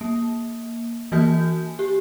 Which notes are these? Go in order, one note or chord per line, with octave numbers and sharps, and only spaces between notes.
A#3
E3 A#3 F#4 G#5 G6
G4